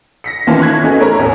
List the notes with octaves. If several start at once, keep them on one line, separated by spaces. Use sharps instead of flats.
A#6 B6 C#7
D#3 E3 A#3 C#4 F4 A5
C#6 F#6 G#6 B6
A3 B3 C#4 D#4 F#4 G#4
A4 A#4 C#5 A#5
A1 E2 B2